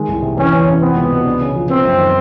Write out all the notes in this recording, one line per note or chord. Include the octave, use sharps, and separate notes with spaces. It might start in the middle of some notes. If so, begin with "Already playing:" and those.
Already playing: D#3 G#3
C2
C3
E2 C#4
E2
C3
B3 C4
C#2
B2
D4
C#3
F3
B3 C4
F#2
D#3